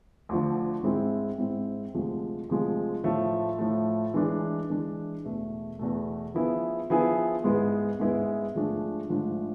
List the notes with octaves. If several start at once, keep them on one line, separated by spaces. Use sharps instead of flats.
D2 D3 F3
G#2 G#3 C4 E4
G#2 G#3 C4 E4
D2 C3 F3 G#3
D2 C3 F3 G#3
A2 F3 A3
A2 F3 A3
E3 G#3 D4
E3 G#3 D4
E2 B2 A3
E2 B2 A3
F3 B3 E4 G#4
F3 B3 E4 G#4
G#2 G#3 B3 E4 G#4
G#2 G#3 B3 E4 G#4
G#2 F3 A3 D4 G#4
G#2 F3 A3 D4 G#4